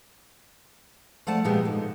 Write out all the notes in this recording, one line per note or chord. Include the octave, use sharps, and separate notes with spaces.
F3 A3 D5 F#5 A5
A#2 F3 G#3 B3 G4
G#2 D3